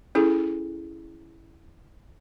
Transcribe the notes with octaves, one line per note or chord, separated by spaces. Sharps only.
C#4 E4 G#4 A4